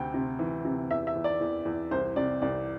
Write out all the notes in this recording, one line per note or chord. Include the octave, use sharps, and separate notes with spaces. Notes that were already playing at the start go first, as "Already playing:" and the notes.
Already playing: D2 C3 G5
C3
E3
C3
E2 E5
E5
E2
D5
E2
E2
C2 C5
C3 D5
C2 D5